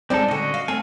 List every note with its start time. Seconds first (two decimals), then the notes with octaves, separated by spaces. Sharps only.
0.10 G#3 C4 D#4 A4 D5
0.28 D3 C#4 F#4 D#5
0.54 F5
0.68 A3 C4 F5 G#5